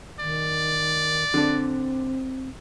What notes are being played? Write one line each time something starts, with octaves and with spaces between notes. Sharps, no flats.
D#3 D5
D3 C4 D4